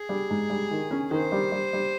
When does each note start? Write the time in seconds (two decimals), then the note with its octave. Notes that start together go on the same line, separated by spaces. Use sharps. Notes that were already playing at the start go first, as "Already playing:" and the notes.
Already playing: G#4
0.09 G3
0.30 G#2
0.50 G3
0.71 D#3
0.91 C#4
1.11 D#3 C5
1.32 G3
1.52 G3
1.73 G3